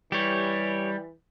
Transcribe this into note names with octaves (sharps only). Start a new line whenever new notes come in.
E3 G3 G4 C#5